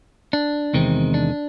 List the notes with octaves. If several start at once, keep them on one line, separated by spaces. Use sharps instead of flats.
D4
E2 C3 D#3 G#3 C4
D4